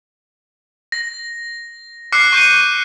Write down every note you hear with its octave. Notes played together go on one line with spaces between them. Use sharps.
A#6
D6 F6 F#6 C7 C#7
C#6 G6 D#7